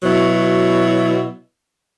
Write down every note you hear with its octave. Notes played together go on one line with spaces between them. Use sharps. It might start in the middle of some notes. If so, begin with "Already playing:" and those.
B2 F#3 E4